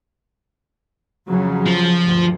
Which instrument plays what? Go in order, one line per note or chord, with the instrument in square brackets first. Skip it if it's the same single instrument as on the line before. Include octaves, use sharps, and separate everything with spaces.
[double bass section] F2 C#3 F#3
[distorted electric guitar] F3
[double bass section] D2 G2